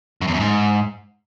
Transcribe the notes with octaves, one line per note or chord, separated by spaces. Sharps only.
F#2
E2
F#2
G#2